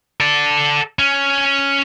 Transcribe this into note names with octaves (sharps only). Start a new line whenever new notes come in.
A4 D5
C#4